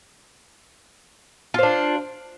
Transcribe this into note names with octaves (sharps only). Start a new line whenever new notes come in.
D4 F4 C5